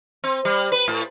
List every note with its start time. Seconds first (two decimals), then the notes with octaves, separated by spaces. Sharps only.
0.24 C4
0.45 G3
0.72 B4
0.88 A2